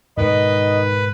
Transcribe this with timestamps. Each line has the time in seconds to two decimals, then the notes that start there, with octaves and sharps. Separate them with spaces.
0.17 G#2 B2 D#3 G#3 B4 D#5